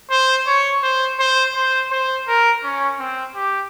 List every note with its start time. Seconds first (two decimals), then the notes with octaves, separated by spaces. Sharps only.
0.11 C5
0.47 C#5
0.83 C5
1.19 C5
1.55 C5
1.91 C5
2.28 A#4
2.63 C#4
2.99 C4
3.35 G4